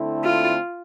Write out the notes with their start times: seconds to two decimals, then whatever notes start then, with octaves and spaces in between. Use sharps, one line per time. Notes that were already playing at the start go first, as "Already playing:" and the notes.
Already playing: D3 A3 C4 E4
0.24 F4